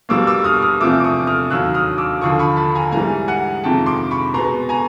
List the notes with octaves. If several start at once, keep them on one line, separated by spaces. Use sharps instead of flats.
B2 G3 A#3 D6 E6
D6 E6
D#6 F6
D#6 F6
E2 C3 F3 A3 D6 E6
D6
C#6 D#6
D#6 F6
D#2 D#3 F#3 E6 F#6
D#6 F6
D6 E6
D#2 D3 F3 C#6 D#6
B5 C#6
A5 B5
G#5 A#5
G#2 E3 G3 G#5 A#5
F#5 G#5
F2 C3 D#3 G#3 G5 A5
C6 D6
B5 C#6
B2 G#3 B3 A#5 C6
G#5 A#5